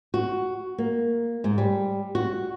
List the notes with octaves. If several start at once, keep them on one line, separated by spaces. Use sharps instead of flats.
F#4
A#3
G#2
G3
F#4